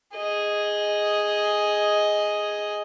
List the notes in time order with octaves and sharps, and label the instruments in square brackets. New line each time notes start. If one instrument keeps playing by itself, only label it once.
[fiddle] G#4 D#5